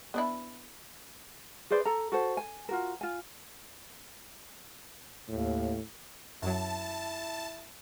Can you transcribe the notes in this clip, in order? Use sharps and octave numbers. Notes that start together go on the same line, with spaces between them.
B3 D4 E4
G#4 B4 C5 D5
A4 A#5
F#4 A4 C5
G#5
F4 F#4 A#4
F4 G#5
D#2 A2
F#2 F#3 E4 A5